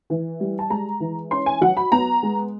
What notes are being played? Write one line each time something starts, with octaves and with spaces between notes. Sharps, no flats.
E3
G3
A5
G#3 A#5
E3
C#4 C6
G#5
F#3 F#5
B5
B3 A#5
G#3